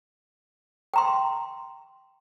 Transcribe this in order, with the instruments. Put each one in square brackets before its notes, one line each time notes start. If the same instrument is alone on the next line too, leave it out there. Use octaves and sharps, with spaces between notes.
[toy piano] G5 A#5 C6